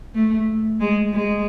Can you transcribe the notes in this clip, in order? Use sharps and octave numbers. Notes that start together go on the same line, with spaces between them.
A3
G#3
G#3